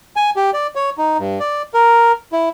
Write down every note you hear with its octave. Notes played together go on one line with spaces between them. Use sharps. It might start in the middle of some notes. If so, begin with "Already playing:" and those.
G#5
G4
D5
C#5
D#4
G2
D5
A#4
E4